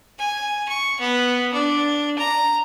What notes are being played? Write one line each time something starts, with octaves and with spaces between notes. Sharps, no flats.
G#5
C#6
B3
D4
A#5